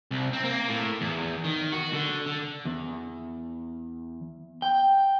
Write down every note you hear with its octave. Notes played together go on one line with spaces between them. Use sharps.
C2
C4
A#3
A2
E2
D#3
F#4
D3
D3
E2
G5